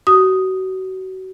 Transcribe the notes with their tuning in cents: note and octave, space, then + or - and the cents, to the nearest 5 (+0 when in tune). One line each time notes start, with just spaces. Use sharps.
F#4 +30 D#6 +0